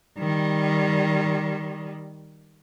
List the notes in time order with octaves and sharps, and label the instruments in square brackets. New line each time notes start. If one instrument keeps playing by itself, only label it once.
[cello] D#3 G3